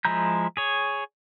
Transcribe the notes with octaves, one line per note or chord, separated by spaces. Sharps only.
F3 G#3 E4 A#5 G6
G#4 C#5